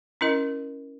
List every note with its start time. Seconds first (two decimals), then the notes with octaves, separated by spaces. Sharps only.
0.21 C#4 E4 A#4 D#5